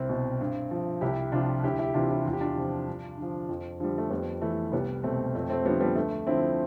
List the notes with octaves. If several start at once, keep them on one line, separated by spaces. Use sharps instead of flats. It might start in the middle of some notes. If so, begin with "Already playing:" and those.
Already playing: C2 C4 E4
B2
G2
F3
C2 E4 G4
C3 D4 F4
F3
D2 E4 G4
E4 G4
C3 E3 D4 F4
E4 G4
E2 F4
G4
D4 F4
C3 F3
G2
D3 F3
F2
D3 F3 G3
A3
F2 G3 B3
E3 A3
C2 G3 B3
B2 A3 C4
F2 A3 C4
A3 C4
D3 F3 G3 B3
G3 B3
D2 A3
D3 F3 C4 E4